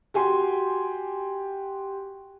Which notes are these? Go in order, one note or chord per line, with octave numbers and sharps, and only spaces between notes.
F#4 G4 G#5 C6